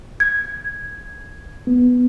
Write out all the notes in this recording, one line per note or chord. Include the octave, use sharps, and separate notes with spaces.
G#6
B3